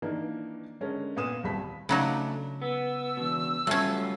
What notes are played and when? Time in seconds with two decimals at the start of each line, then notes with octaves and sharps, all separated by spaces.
0.02 D#3 E3 A#3 D4
0.81 D3 G#3 C#4 A#4
1.16 A#2 B3 D#6 E7
1.43 D#1 C2 G3 B5 B6
1.89 C#3 F#3 A3 D4 D#4
2.62 B3 E6
3.17 E2 B2
3.67 F#3 G3 A3 C#4 F4